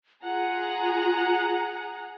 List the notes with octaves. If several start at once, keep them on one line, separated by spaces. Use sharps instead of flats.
F4 G#4 F#5 A#5